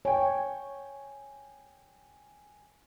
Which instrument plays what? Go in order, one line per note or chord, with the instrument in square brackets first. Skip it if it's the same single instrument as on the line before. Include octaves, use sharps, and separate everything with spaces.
[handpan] C#5 [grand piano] G5 G#5